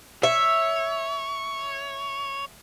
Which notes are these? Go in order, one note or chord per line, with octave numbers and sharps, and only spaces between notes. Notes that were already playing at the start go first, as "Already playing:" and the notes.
C#5 E5